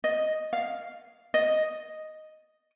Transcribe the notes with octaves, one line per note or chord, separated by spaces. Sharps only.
D#5
F5
D#5